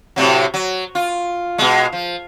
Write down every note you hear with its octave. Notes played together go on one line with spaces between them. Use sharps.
A2 C3 F#3
F#3
F4
B2 G#3
F3